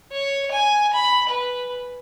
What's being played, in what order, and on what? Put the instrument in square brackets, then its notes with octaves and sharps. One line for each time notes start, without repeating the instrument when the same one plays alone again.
[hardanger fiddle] C#5
G#5
B5
B4